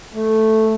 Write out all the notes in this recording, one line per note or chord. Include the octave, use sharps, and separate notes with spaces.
A3